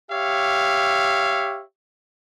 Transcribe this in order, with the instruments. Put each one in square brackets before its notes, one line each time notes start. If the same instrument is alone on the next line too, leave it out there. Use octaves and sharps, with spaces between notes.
[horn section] G4 C#5 E5 F5